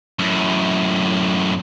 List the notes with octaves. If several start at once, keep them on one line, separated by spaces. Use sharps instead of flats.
F#2 A2